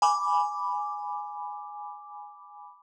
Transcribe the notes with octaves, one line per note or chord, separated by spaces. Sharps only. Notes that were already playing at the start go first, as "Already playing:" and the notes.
G#5 B5 D6